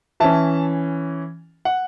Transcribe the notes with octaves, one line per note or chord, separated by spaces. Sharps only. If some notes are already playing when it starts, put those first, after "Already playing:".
E3 C#4 E5 A5
F#5